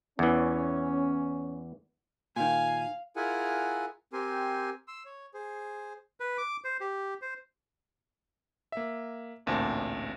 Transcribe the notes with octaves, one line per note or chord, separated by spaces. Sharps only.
E2 E3 C#4
A#2 D#3 F5 G#5
E4 F4 G#4 A#4 F#5 G#5
C4 G4 A#4 G#5 C6
C6 E6
C#5
G#4 C5
B4
D6
C5
G4
C5
A#3 E5
A1 D2 A#2 C4 A5